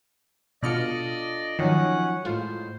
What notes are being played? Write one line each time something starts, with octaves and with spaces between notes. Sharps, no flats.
B2 D4 F4 A4 D5 D#5 F6 C#7
D#3 F3 F#3 C#4 D#4 F#5
A2 G#3 F4 C5